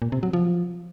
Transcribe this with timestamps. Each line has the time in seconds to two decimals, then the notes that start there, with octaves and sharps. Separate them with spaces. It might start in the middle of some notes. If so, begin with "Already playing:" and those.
0.02 A#2
0.12 C3
0.23 F#3
0.33 F3